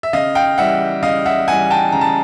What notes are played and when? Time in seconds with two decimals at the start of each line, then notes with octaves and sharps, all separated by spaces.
0.03 E5
0.13 C#3 D#5 F5
0.35 F5 G5
0.58 E3 G3 E5 F#5
1.02 C#3 D#5 F5
1.25 E5 F#5
1.48 E3 G3 F#5 G#5
1.71 G5 A5
1.92 C#3 A#5
2.01 A5